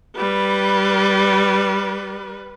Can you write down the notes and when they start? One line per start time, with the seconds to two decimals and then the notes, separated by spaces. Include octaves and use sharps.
0.17 G3 B4